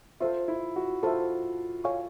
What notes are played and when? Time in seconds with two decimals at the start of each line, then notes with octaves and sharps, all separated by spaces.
0.21 F4 A4 C5 E5
0.48 E4
0.76 F#4
1.03 F4 A4 C5 E5
1.84 A4 C#5 F5 G#5 C#6